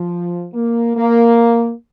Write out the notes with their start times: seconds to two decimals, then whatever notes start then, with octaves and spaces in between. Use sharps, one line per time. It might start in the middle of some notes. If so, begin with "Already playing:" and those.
Already playing: F3
0.54 A#3
0.95 A#3